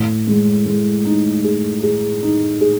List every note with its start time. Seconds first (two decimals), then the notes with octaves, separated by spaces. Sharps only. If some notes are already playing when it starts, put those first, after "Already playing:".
Already playing: A2
0.27 G#3
0.66 G#3
1.05 D#4
1.44 G#4
1.83 G#4
2.23 D#4
2.61 G#4